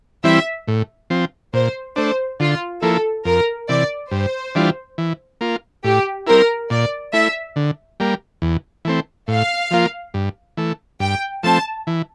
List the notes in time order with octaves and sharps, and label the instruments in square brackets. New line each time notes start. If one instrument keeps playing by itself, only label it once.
[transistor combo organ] E3 G3 C4 E4 [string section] E5
[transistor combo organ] A2
F3 C4
[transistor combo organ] A#2 [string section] C5
[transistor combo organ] A3 D4 [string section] C5
[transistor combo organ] D3 [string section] F4
[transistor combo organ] F3 A#3 E4 [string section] A4
[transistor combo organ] F2 [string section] A#4
[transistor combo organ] C3 E3 [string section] D5
[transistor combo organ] G2 [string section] C5
[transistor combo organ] E3 G3 D4 F4
E3
A#3 F4
[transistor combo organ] A2 [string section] G4
[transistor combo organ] G3 C4 E4 [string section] A#4
[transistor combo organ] A#2 [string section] D5
[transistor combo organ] A3 E4 [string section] E5
[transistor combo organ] D3
G3 A#3
E2
E3 A3 C4
[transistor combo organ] A2 [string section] F5
[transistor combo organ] F3 A#3 F4
G2
E3 A3
[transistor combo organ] G2 [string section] G5
[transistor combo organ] F3 A3 C4 [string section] A5
[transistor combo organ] E3